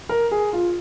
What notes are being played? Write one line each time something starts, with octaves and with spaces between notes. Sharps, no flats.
A#4
G#4
F4